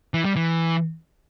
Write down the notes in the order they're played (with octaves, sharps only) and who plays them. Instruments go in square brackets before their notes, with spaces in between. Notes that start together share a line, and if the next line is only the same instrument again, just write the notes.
[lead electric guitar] E3
G3
E3